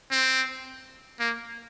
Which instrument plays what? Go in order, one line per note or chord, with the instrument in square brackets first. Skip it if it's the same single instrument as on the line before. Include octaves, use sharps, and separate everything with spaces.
[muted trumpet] C4
A#3